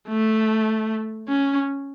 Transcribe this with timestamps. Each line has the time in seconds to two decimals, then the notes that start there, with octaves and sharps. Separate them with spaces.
0.08 A3
1.28 C#4